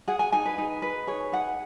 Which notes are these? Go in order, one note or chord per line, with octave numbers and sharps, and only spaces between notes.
G#4 F#5
G#5
D#4 G#5
B4
D#4
B4
G#4 C#5
D#4 F#5